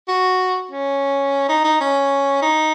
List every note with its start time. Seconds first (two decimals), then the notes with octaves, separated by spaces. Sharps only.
0.08 F#4
0.71 C#4
1.49 D#4
1.64 D#4
1.81 C#4
2.42 D#4